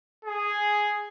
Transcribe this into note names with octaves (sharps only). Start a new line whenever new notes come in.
G#4